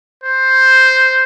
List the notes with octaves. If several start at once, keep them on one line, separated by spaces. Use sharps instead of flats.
C5